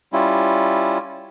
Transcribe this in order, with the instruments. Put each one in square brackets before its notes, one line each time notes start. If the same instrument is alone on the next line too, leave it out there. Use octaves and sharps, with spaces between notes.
[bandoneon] G3 C#4 E4 F4